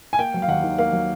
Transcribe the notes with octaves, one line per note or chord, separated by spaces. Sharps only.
G#5
A#3 G5
F#3
F5
D#2 F#5
D#3
A#3 F5
F#3